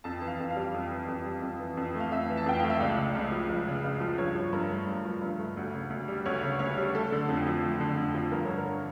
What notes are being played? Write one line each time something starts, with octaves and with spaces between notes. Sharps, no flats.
F2 A5
E3
F5
F2
F5
G3
F2
E3
F2
G3
F2
E3
F2
A3 F5
F2 E5
E3
A5
F2 G5
A3 F5
E5
C#2 D5
C#3
C#2
F3
C#2
C#3
C#2
F3
G2 C#5
F3
G2 A#4
A3
G2
F3
G2
A3
D2
C#3
D2
G3
D2 C#5
C#3
D2 C#5
G3
A3 A4
D3
F2
F3
A3
D3
F2
F3
G2 A#4
D3 C#5
A#4